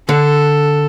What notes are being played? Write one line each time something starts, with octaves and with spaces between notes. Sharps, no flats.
D3 A4